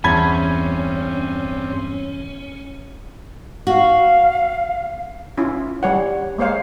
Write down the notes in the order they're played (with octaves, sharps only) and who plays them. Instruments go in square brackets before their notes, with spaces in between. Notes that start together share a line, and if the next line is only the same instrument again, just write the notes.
[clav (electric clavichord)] E2 [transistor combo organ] G2 C4 [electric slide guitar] C#4 [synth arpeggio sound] A5 B5 G#6
[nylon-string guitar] F#4 [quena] F5
[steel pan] C#4 E4 F4
G3 C#5 F#5
G#3 A#3 C5 C#5 F5